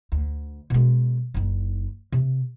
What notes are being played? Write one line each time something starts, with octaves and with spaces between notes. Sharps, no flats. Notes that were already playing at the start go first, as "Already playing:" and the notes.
D2
B2 G#3
F#1 D#4
C3